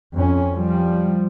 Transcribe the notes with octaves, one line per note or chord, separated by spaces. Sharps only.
F2 C#4
F3 G3